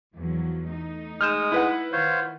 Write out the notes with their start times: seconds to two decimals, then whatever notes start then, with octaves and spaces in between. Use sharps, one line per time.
0.15 E2 F3 F#3
0.70 A3 D#4
1.21 G#3 D#6 F6 G6 E7
1.52 E4 B4 F#5
1.92 D#3 F4 C5 C#5